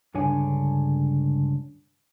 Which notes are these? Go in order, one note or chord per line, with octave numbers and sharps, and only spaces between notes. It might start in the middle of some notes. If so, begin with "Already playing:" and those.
C#2 G2 D3 D4 C#5 G#5